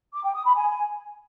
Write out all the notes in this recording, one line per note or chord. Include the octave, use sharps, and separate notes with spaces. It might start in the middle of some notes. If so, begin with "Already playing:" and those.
D6
G5
D#6
B5
G#5